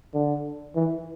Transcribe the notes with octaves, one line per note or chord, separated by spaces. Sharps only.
D3
E3